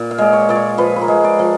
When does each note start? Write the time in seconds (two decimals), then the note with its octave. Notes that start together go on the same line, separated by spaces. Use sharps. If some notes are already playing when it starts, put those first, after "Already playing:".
Already playing: A#2
0.11 F5
0.18 G#3 D5
0.33 C#5
0.49 A#2 D5
0.56 C#5
0.78 F3 B4
0.96 B4
1.01 A#4
1.08 G#3
1.24 D5
1.39 F3